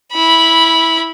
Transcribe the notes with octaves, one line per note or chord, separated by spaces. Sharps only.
E4 B5